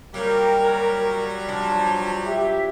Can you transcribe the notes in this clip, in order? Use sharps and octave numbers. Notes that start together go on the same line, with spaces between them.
F#3 G3 A#3 G4 A#4
F3 D4 D5 A5
G4 E5